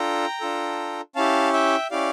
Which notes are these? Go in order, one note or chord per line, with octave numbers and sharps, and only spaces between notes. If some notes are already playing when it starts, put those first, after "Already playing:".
Already playing: D4 F4 A4 G5 A#5
D4 F4 A4
C#4 E4 G4 F5 A5
E5 G5
C#4 E4 G4 D5 F5